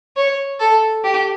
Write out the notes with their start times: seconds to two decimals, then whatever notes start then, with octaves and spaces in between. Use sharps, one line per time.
0.16 C#5
0.59 A4
1.04 G4